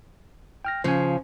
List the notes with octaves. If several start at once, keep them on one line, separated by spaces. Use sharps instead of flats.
G5 F6 A#6
C#3 F3 C5 G#5